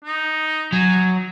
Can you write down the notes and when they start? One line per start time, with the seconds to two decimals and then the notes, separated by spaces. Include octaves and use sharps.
0.05 D#4
0.73 F#3 G#5